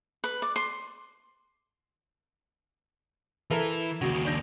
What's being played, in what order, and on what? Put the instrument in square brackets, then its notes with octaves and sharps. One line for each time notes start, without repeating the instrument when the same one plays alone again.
[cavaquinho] B4
D5
C6
[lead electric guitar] E3 [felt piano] E4 A4 A#4
[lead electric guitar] D#2 C#3 [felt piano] F#4
[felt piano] D4 G6 A#6